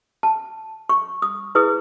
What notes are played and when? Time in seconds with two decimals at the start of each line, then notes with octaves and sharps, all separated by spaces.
0.23 A5
0.89 C#6
1.22 D#6
1.55 E4 G#4 B4 D#6